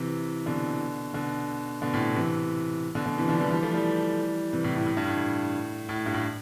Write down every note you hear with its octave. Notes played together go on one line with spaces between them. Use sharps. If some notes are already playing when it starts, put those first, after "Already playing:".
Already playing: C3 E3
B2 D3
B2 D3
B2 D3
A2 C3
C3 E3
B2 D3
B2 D3
C3 E3
D3 F3
E3 G3
E3 G3
F3 A3
E3 G3
C3 E3
A2 C3
A2
A2
G2
A2
A2
G2
A2